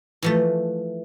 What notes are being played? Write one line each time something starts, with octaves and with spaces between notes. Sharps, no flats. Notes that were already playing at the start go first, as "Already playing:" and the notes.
E3 F3 A3